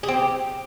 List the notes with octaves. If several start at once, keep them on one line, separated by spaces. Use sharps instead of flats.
G#4
C4
G4